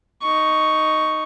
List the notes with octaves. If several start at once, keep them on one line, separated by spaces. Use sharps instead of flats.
D#4 C#6